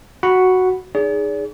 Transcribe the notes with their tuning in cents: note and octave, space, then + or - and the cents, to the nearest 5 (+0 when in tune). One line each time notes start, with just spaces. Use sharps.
F#4 +0 F#5 +0 B5 +0
D#4 -10 G#4 +0 D5 -45